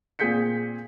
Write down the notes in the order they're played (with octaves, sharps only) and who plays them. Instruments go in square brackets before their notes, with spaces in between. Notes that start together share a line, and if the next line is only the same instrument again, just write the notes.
[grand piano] A#2 C4 G#4 G6 B6 C#7